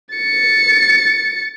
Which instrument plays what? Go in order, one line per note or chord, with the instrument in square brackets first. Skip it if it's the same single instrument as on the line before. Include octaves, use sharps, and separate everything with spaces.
[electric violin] A6 C#7